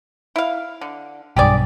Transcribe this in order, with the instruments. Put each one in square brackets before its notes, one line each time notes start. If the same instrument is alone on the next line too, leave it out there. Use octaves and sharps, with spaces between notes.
[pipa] E4 F5
D3
[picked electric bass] B1 G2 [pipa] G4 G#4 D5